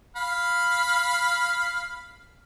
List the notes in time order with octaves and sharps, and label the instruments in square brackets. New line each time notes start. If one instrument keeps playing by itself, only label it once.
[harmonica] F5 B5